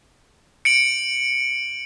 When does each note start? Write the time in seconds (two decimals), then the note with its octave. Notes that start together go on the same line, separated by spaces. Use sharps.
0.65 C#7 D7 F#7